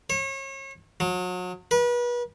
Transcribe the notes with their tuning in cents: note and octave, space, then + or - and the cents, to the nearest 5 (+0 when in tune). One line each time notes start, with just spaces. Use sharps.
C#5 -35
F#3 -35
B4 -35